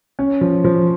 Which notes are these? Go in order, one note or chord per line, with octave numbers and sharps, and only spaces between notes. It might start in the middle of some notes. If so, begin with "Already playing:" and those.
C#4
F3
F3